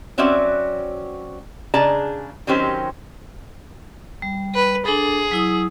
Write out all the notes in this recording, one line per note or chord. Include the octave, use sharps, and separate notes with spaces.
F#3 C4 C#4 F#4 D5 E5
C#3 D4 G#4 D5 A5 A#5
D#3 F#3 C4 C#4 G4 C5
G3
B4
D4 G#4 A4
F#3 E4 D#6